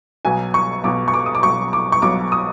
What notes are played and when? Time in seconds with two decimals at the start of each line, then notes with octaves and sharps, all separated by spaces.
0.25 B1 B2 F#3 G#5
0.54 C#6
0.83 B1 B2 F#3 D6
1.08 C#6
1.14 D6
1.26 D#6
1.35 D6
1.43 B1 B2 F#3 C#6
1.73 D6
1.92 C#6
2.02 B1 B2 F#3 D6
2.32 D#6